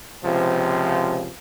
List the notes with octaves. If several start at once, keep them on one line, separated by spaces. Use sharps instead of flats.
C#2 C3 F3